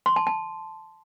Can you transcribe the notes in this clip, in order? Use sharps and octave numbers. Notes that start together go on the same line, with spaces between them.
C6
A5
A5